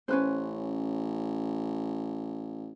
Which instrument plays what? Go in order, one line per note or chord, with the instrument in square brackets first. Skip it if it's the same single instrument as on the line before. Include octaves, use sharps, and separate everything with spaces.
[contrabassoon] A1 [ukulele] C#4 B4 C5